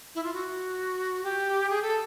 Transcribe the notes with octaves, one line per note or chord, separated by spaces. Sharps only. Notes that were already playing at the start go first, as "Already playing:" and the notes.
E4
F4
F#4
G4
G#4
A4